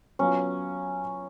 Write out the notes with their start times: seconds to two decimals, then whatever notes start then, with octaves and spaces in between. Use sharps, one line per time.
0.19 F#3 B3 C#4 F4